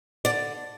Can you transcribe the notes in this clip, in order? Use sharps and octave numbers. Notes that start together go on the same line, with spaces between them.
D3 D5